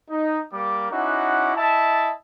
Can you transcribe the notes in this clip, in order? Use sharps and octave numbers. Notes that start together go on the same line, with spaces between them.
D#4
G3 A#3 A#4 D6
C#4 D#4 E4 F#4 F#5 D6
E4 D#5 E5 A5